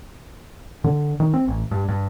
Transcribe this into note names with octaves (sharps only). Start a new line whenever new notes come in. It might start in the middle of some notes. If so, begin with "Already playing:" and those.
D3
D#3
C4
A1
G2
G2